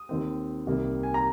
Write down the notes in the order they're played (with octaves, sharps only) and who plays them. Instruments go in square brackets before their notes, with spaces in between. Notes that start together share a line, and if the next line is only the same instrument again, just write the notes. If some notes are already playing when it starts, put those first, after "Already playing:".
Already playing: [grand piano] D#6
D#2 D#3 C4
C2 C3 D#3 A#3
G#5
A#5